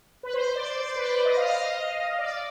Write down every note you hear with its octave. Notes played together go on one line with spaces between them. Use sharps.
B4
C5
D5
D5
B4
C5
D#5
F5
D#5
D5